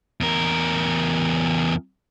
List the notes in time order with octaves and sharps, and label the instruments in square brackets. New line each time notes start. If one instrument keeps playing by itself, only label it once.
[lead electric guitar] E2 A#4